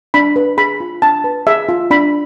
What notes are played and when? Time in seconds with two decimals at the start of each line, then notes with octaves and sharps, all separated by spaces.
0.14 D4 B5
0.36 B4
0.57 G#4 B5
0.80 F4
1.02 D4 A5
1.24 B4
1.47 G#4 E5
1.69 F4
1.91 D4 B5